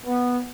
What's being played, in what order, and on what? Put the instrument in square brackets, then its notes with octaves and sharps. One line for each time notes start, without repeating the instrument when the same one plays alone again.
[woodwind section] B3